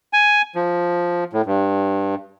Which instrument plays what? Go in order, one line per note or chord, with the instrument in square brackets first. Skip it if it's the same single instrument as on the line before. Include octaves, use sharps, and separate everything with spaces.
[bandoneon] G#5
F3
A2
G2